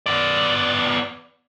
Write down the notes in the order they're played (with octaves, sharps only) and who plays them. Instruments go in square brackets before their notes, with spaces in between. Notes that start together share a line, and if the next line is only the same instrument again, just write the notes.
[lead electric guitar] B3 D5